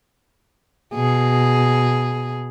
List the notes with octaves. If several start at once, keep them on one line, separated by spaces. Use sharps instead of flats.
B2 G#4